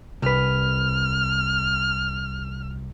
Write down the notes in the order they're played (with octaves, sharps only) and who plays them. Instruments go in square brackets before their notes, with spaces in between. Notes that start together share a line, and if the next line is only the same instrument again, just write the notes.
[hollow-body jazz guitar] C2 B4 [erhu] F6